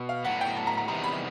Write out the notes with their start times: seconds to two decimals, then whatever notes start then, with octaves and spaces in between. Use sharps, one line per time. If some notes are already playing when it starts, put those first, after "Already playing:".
Already playing: B2
0.09 F5
0.24 A2 F#3 B3 F#5
0.41 G5
0.57 A5
0.67 A#5
0.77 A#5
0.88 E2 C3 D#3 G3 B3 A#5
1.03 B5